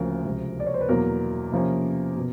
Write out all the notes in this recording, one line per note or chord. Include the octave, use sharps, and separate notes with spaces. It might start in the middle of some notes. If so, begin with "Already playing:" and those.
Already playing: D2 C#3 F3 A#3 A#4
C#2 C3 F3
D5
C#5
C5
B4
E2 B2 F#3 A#3 A#4
C3 F3 A#3 C#4
B2